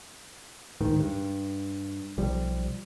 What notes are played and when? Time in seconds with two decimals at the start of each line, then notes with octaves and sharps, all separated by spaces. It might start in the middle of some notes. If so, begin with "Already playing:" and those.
0.81 D1 G#2 D#3
1.00 G2
2.18 B1 F3 G3